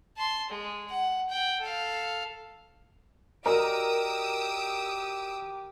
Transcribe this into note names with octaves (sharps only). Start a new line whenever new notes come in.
A5 C6
G#3
F#5
F#5 G5
A4 F5
F#4 G4 A#4 D5 D#5 D#6 E6 D7